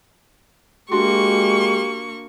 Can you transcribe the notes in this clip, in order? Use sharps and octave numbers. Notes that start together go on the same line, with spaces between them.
G#3 A#3 D4 F#4 G4 C6 C#6